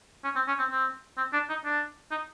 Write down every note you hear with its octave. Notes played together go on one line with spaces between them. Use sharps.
C#4
C4
C#4
C4
C4
C4
D4
D#4
D4
D#4